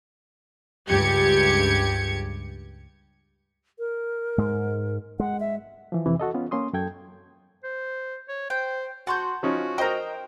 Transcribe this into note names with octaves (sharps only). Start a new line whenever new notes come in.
C#2 G2 G4 G#6 C#7
A#4
G#2 G#3
G#3 F#5
E5
E3 F3
F2 C3 E3
F#4 A4 D#5
B3 C#4 F4
A#3 C#4 C6 D#6
F#2 A4 G5 G#6
C5
C#5
C5 G5
F#4 F#5 A5 C6 C#6 G6
F3 C#4 D#4 F#4
A#4 C5 D#5 G5 A#5